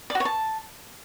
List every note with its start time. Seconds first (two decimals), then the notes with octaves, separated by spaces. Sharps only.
0.10 D5
0.15 F#4
0.20 C#5
0.25 A5